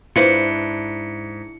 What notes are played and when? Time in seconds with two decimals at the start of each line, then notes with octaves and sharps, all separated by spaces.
0.16 G#2 D4 E4 F4 B4 C5 C#7